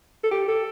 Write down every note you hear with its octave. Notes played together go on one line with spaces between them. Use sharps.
A4
G4
A4